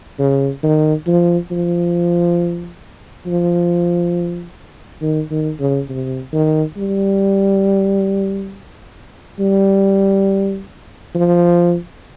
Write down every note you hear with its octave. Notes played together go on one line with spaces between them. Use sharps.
C#3
D#3
F3
F3
F3
D#3
D#3
C#3
C3
D#3
G3
G3
F3